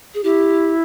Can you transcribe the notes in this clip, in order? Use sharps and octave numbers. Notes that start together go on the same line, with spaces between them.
G#4
E4 G4